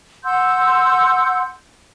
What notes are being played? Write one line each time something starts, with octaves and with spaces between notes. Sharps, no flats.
F#5 C6 E6 G6